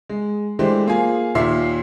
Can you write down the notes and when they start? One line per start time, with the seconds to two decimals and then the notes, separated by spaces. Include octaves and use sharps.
0.09 G#3
0.59 E3 G#3 A3 D4 G4 C5
0.86 A#3 F4 G#4 G#5
1.35 D#2 A#2 E5 C6 C7